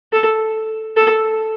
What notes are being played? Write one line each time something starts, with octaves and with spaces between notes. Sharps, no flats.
A4
A4